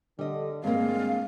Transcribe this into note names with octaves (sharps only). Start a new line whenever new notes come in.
D3 G3 D#5
G2 G#3 A#3 C4 F5